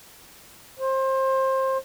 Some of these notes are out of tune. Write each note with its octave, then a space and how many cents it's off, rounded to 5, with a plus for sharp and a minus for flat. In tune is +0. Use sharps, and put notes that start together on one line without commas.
C5 +25